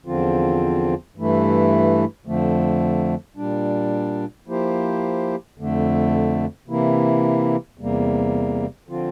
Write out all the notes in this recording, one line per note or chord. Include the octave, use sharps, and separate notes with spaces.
E2 D3 F3 C4 F4
G2 E3 A3 E4
F2 D3 F3 A3
A#2 G3 D4
F3 A#3 E4 G4 C5
F2 D3 A3
C3 E3 A#3 E4
E2 C3 G3 A#3
D3 F3 C4 F4